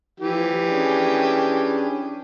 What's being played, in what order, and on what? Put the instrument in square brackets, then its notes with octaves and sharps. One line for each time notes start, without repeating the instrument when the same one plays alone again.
[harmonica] E3 G4 [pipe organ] F3
[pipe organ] C#4 D4 G#4